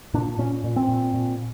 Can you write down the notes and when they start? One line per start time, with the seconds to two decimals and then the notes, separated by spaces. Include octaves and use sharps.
0.14 A#2 D4
0.38 A#2 C#4
0.64 A#2
0.76 C4
0.88 A#2
1.14 A#2